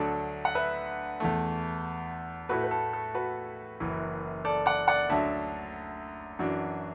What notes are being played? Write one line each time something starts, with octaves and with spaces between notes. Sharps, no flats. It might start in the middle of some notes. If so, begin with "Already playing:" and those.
Already playing: D2 D3 F#3 A3 D4 A4 D5
F#5
B4 E5
E2 E3 A3
A2 A3 E4 F#4 B4
B4
A4
A4
F#4 B4
F#1 F#2 E3
A4 D5
D5 F#5
D5 F#5
D2 D3 F#3 D4 E5 A5
F#2 E3 D4 F#4